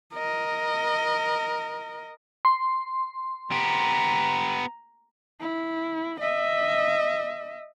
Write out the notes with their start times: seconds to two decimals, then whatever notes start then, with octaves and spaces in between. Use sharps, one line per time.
0.14 A#4 D#5
2.45 C6
3.51 B3 G4 A#5
5.40 E4
6.20 D#5 E5